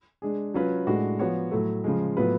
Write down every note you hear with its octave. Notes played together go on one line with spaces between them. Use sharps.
G#3 D4 G#4
F#3 C#4 F4 B4
A2 G#3 D4 F#4
F3 B3 F#4 C#5
A2 F#3 A3
C#3 F3 G#3
A2 F#3 B3 F4 B4